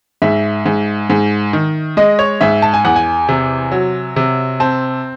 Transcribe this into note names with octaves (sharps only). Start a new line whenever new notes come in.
G#2 E5
G#2
G#2
D#3
G#3 D#5
C#5
G#2 E5
A5
G#5
E2 F#5
G#5
C3
F#3
C3
C4 A5